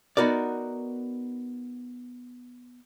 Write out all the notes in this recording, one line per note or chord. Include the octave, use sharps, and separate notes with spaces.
B3 D#4 F#4 A#4 D5